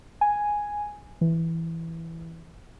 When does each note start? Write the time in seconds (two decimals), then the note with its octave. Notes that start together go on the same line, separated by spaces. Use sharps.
0.21 G#5
1.21 E3